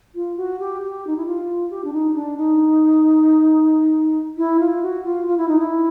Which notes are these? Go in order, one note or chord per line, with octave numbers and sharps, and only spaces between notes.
F4
F#4
G4
G4
D#4
E4
F4
G4
D4
D#4
D4
D#4
E4
F4
F#4
F4
F4
E4
D#4
E4